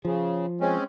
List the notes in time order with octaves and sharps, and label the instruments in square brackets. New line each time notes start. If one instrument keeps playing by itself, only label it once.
[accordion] C#3 [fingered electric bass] F3
[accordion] G#3 C4 C#4